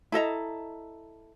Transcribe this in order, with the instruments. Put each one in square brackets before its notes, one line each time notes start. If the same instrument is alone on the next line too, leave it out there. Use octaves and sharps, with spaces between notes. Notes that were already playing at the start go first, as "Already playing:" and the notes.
[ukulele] E4 A4 D#5 A#5